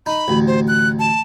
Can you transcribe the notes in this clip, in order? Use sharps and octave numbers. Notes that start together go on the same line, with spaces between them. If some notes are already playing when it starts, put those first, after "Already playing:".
D#4 B5
A1 D2
C5
F#6
A5